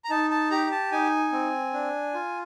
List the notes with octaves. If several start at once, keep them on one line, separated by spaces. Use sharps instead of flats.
A#5
D#4 A5
A5
G4 A#5
A5
D#4 G#5
C4
D4
F4